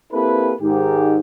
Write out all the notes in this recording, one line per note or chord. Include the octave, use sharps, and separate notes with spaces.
A#3 C4 E4 G4 A4 B4
G#2 D#3 G4